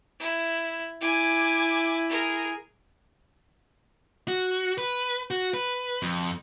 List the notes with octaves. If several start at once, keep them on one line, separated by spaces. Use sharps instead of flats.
E4
E4 G#5 D6
G#4 A#4
F#4
B4
F#4
B4
F2